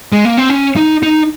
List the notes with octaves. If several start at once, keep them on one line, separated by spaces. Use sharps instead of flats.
G#3
A#3
C4
C#4
D#4
D#4